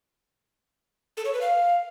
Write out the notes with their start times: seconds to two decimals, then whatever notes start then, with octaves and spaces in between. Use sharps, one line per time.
1.17 A4
1.25 C#5
1.33 B4
1.41 F5